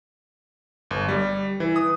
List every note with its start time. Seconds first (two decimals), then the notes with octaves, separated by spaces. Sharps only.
0.91 G1
1.08 G3
1.60 E3
1.76 D#6